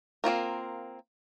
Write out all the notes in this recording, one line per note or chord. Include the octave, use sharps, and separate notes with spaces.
A#3 C4 F4 A#4